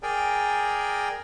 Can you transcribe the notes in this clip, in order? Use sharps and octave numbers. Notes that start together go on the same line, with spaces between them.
G#4 A#4 D5 G5 G#5 A#5